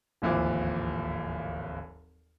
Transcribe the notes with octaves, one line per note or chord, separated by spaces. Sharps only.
D1 G#1 D#2 E3 F3 D6